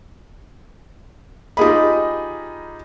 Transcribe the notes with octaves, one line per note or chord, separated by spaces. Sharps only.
D#4 F4 G4 G#4 D#5 B5